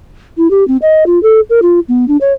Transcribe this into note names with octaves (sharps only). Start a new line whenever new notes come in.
E4
G4
C4
D#5
F4
A4
A#4
F4
B3
D4
C#5